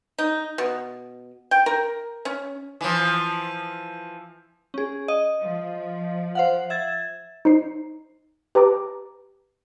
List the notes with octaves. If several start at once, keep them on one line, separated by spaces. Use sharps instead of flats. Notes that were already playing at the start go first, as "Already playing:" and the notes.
D#4
B2
G5
A#4
C#4
E3 F3
C#4 G#4
D#5
F3
C5 F5 F#5
E5 G#6 A6
D#4 C5 C7
G4 B4 A5 A#5 D6